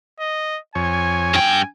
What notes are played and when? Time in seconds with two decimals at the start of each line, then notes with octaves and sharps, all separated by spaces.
0.20 D#5
0.75 F2 C#5 G#5
1.34 G2 G5